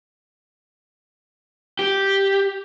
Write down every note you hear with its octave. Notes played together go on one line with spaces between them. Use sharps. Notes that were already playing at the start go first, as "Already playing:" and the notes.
G4